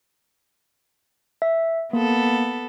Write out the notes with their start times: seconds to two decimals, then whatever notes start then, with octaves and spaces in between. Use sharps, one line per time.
1.42 E5
1.93 A#3 B3 A4